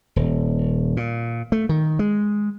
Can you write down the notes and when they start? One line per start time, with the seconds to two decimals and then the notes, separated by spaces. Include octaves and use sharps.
0.16 D#1
0.97 A#2
1.52 A3
1.69 D#3
1.99 G#3